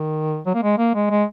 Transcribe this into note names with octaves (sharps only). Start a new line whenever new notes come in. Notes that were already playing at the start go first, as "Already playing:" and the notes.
Already playing: D#3
F#3
A#3
G#3
A#3
G#3
G#3